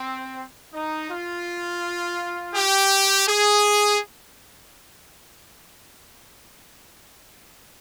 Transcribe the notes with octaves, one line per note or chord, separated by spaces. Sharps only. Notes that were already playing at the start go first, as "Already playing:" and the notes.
Already playing: C4
D#4
F4
G4
G#4